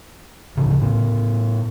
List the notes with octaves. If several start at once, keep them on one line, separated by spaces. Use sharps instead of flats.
D2 A2 C#3
A2 B3